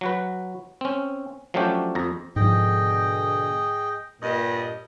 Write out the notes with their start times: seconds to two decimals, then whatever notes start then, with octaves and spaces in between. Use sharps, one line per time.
0.01 F#3 F#4 B4
0.81 C4 C#4
1.54 F3 F#3 A3 C#4 D4 G4
1.95 F2 A#5
2.36 G#2 B2 D3 F3 G#4 D#5 G5
4.22 G2 A#2 D#5